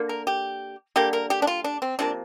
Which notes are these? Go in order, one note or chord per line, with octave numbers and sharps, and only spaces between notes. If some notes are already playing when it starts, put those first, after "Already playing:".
Already playing: D3 A#3
A#4
G4
D3 G3 A#3 G4
A#4
G4
D4
F4
D4
C4
C3 F3 A#3 D4